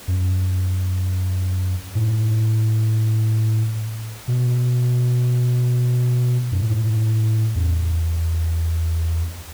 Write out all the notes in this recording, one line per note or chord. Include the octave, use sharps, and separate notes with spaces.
F#2
A2
B2
F#2
A2
E2